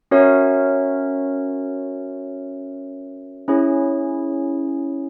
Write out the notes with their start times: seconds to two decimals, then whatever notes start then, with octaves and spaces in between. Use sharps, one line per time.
0.11 C#4 F#4 A#4 C#5 E5
3.48 C#4 E4 G#4 C#5